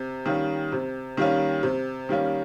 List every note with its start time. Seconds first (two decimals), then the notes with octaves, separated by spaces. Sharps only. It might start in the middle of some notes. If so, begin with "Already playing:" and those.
Already playing: C3
0.26 D#3 G3 A#3 C#4
0.72 C3
1.17 D#3 G3 A#3 C#4
1.63 C3
2.09 D#3 G3 A#3 C#4